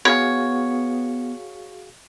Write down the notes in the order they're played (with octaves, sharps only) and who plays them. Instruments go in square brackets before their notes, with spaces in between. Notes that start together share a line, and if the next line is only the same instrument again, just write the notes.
[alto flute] B3 [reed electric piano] F#4 G#4 F5 [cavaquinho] C#5